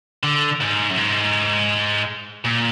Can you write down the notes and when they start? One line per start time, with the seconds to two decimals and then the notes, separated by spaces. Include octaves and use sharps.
0.23 D3
0.60 G#2
0.90 F#2
0.97 G#2
2.45 A#2